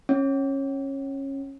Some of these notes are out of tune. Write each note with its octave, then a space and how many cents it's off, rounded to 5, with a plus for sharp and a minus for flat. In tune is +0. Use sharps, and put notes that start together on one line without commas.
C#4 -20